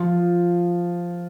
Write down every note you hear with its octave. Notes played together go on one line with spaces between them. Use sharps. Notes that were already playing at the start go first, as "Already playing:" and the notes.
Already playing: F3 F4